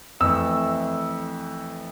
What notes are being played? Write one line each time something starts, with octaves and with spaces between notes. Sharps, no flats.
F2 E3 A3 E6